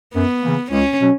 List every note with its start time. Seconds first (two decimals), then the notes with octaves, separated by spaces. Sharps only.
0.14 F#2 B3
0.43 C#3 E3 A#3
0.71 C#2 C#4
1.00 B2 F#3 C#4